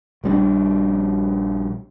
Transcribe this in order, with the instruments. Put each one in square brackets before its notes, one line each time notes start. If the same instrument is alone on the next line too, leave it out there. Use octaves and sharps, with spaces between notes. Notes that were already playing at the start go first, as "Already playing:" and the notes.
[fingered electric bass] A#1 G3 C4 D4